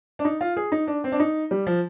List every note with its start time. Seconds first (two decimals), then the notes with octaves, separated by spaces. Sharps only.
0.19 D4
0.25 D#4
0.41 F4
0.57 G#4
0.72 D#4
0.87 D4
1.04 C4
1.12 D4
1.20 D#4
1.51 G3
1.67 F3